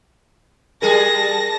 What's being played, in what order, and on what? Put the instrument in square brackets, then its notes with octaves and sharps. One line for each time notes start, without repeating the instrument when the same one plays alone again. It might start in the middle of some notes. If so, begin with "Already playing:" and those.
[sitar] G3 G#4 A#4 [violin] A5 A#6